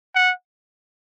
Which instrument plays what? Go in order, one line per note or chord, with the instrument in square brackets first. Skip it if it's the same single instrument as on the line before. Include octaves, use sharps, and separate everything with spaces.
[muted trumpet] F#5